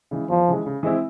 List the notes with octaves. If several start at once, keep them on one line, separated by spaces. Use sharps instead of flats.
C#3 E3 G#3
E2 F3
C#3 E3 G#3
C#3
E3 G#3 C4 E4